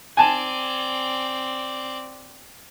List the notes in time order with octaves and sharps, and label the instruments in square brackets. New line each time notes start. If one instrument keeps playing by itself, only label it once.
[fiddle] C4 D5 [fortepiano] G#5 A5